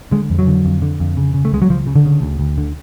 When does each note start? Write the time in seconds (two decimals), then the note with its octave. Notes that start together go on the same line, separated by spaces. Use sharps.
0.11 D3 G#3
0.30 F2
0.39 F#3
0.47 D3
0.65 F2
0.82 D3
1.00 F2
1.17 C#3
1.34 C#3
1.45 A3
1.53 C#2 G#3
1.62 F#3
1.70 C#2 F3
1.87 C#3
1.96 D3
2.05 C#3
2.22 D2
2.40 D2
2.58 D3